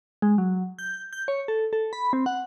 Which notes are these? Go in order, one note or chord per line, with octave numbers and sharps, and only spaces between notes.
G#3
F#3
G6
G6
C#5
A4
A4
B5
C4
F#5